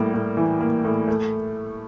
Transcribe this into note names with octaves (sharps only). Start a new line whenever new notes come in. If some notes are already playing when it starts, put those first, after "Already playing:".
Already playing: A2 G3 A#3
A2
E3
A#3
A2
A3